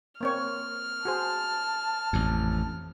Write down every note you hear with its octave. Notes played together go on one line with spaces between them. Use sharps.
A#3 C4 C#5 F6
F#4 G#4 C5 A5
A1 F2